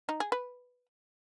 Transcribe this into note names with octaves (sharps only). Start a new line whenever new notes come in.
D#4
G#4
B4